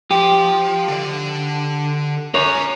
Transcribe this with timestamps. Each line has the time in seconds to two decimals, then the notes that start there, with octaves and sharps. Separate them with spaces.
0.11 F3 G4
0.88 D3 D5
2.34 C#4 A#4 C#5